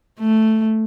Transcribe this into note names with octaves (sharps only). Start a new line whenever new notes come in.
A3